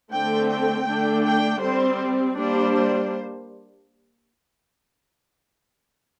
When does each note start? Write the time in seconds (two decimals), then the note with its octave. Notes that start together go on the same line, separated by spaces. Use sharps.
0.12 D3 A3 C4 G5
0.49 G5
0.87 D3 A3 D4
1.24 G5
1.61 G3 C4 C5
2.35 G3 A#3 D4 C5